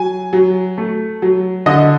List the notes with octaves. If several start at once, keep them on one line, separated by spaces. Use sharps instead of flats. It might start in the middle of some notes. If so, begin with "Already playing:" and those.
Already playing: F#3 G#5
F#3
A3
F#3
D3 D#5